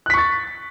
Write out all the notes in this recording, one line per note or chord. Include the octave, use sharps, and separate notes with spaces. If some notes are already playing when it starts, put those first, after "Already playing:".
C#6 F#6 A6 B6